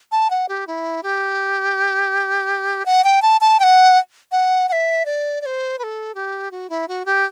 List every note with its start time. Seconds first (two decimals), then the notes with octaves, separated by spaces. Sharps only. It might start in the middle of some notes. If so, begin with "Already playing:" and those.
0.12 A5
0.30 F#5
0.49 G4
0.67 E4
1.03 G4
2.86 F#5
3.04 G5
3.22 A5
3.41 A5
3.60 G5
3.63 F#5
4.32 F#5
4.69 F#5
4.72 E5
5.05 D5
5.41 D5
5.46 C5
5.79 B4
5.83 A4
6.15 G4
6.51 F#4
6.70 E4
6.88 F#4
7.06 G4